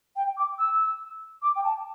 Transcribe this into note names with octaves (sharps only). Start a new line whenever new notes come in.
G5
D6
E6
D6
G5
A5